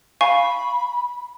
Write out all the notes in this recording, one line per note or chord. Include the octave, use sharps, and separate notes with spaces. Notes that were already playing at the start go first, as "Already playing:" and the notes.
F5 G#5 B5 C#6